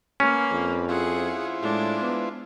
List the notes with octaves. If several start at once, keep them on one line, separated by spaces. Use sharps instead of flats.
A#3 C#4 B4
F2
E4 F4 G#4 C5 F#5
A2 G#3 D4
B3